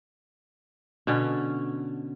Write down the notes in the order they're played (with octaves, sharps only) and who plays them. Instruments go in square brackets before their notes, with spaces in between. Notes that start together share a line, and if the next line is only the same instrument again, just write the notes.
[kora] B2 D3 C#4